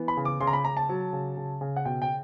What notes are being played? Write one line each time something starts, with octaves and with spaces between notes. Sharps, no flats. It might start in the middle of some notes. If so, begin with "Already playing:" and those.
Already playing: E3 B3
B5
C#3
D6
C#3 C6
A#5
B5
C#3 A#5
A5
F#3
C#3
C#3
C#3
F#5
B2 G5
G5